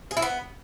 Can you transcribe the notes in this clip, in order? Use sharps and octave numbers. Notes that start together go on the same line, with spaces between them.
G#4
E4
B3